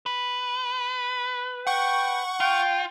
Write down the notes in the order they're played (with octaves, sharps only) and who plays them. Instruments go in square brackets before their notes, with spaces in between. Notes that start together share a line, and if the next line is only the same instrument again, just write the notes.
[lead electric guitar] B4
[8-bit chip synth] F#5 C#6 [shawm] G5
[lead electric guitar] F4 [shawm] G5